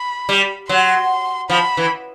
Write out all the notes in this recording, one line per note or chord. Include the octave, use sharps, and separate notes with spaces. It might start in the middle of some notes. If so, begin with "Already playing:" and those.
Already playing: B5
G3
F#3 C6
F3 B5
E3